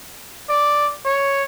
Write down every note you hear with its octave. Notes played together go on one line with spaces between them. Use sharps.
D5
C#5